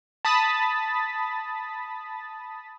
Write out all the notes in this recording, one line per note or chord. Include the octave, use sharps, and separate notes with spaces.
A5 B5 D#6 A6 B6